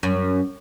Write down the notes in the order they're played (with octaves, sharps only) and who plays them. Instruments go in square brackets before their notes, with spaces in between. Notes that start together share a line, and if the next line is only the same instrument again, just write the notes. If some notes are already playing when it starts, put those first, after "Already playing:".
[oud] F#2